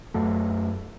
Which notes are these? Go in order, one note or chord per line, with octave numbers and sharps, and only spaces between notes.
F#2 F#3 A3